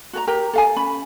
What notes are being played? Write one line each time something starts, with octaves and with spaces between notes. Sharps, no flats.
F#4 A4 A#5
G4 A#4 G5 A#5
A4 F5 G#5
C#4 B5